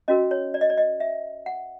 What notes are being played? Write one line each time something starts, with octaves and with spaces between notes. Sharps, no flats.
C#4 F#4 A#4 D#5
C#5
D5
D#5
D5
D#5
E5
F#5